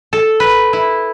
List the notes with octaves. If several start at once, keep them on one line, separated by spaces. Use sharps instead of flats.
A4
B4
E4